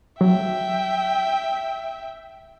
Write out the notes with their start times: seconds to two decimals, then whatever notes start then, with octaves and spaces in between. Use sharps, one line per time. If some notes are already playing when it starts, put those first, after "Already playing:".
0.21 F#3 E5 G5